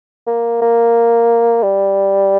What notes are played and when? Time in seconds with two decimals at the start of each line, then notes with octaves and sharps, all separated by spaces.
0.27 A#3
0.62 A#3
1.63 G3